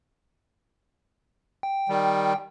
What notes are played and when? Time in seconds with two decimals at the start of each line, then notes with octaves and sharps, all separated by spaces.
1.63 G5
1.89 D#3 G3